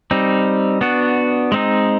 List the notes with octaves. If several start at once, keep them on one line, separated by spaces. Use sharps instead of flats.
G3 C4 D#4
B3 D4 F#4
G#3 C4 D#4